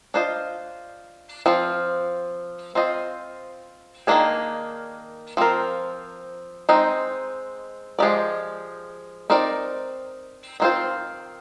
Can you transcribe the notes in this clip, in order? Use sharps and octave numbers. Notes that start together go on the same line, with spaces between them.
D4 F4 C5 D#5
F3 C4 F4
C4 F4 C5 D#5
D#3 A#3 D4 G#4
F3 C4 F4 A#4
G#3 C4 D#4
F3 G#3 D#4 G4 D5
C4 D#4 A#4 D5
D#3 G#3 C4 F4 C5